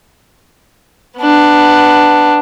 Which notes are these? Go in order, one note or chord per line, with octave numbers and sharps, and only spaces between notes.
B3 D4